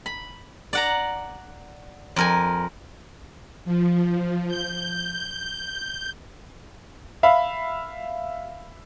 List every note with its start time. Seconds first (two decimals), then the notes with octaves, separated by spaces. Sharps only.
0.06 B5
0.73 D5 F#5 A#5
2.16 F2 A#4 G#5
3.65 F3
4.48 G6
7.23 E5 F5 B5